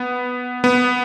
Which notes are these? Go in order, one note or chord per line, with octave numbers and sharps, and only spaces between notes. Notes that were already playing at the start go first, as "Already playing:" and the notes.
Already playing: B3
B3